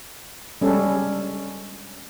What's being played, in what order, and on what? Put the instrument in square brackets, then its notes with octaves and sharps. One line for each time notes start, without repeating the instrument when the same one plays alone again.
[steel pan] G3 G#3 C#4 A4